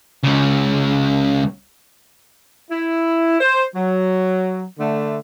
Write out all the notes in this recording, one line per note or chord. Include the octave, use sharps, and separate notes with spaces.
C#2 C#3
E4
C5
F#3
D3 A3